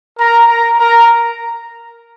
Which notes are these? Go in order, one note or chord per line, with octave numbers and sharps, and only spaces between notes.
A#4 A#5
A#4 A#5
A#4 A#5